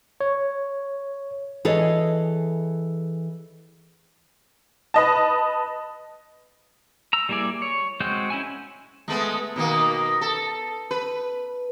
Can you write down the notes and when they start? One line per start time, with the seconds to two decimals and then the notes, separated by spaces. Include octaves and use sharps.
0.21 C#5
1.65 E3 G#4 A4 C#5 D#5
4.94 B4 D#5 A5
7.13 A#5 E6
7.29 G3 A#3 E4 G#4 D5
7.62 C#5
8.00 G#3 C4 F#4 G6
8.30 C#4 E4 G#5
9.08 G#3 A3 B3
9.56 B2 D#3 A#3
10.21 A4
10.91 B4